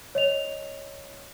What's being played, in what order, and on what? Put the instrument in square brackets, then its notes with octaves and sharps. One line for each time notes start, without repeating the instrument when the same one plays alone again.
[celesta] C#5 D#5 F7